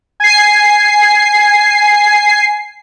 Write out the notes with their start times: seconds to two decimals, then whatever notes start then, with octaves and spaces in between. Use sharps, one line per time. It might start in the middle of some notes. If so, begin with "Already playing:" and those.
0.20 G#5 C7